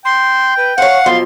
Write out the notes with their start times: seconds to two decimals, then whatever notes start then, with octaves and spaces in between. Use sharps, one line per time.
0.05 G5 C6
0.57 B4
0.78 C5 C#5 F5 F#5
1.06 F#2 B2 F3 C6